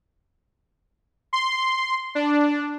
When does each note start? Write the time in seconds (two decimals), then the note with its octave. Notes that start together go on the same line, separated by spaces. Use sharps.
1.33 C6
2.15 D4